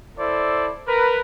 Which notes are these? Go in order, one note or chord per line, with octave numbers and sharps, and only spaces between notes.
E4 A4 C5 D5
A#4 B4